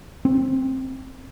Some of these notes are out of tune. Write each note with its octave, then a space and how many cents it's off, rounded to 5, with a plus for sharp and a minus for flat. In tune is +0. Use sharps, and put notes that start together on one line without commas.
C4 +10